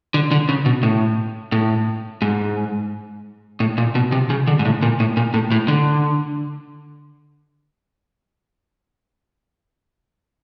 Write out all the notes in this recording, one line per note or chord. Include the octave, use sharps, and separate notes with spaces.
D3
D3
C#3
B2
A2
A2
G#2
A2
A#2
B2
C3
C#3
D3
G#2
A2
A#2
A2
A#2
A2
A2
D3